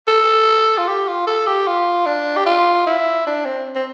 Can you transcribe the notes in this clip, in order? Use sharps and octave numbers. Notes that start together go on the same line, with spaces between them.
A4
F4
G4
F4
A4
G4
F4
D4
G4
F4
E4
D4
C4
C4